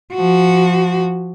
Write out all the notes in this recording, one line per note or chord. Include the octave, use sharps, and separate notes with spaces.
F3 F#4